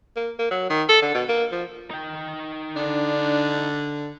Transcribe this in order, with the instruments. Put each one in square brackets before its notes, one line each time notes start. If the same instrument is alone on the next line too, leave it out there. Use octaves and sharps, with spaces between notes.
[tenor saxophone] A#3
A#3
F#3
D#3
A4
D3
B2
A#3
F3
[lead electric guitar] D#4 G5
[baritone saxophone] D3 [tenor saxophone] D4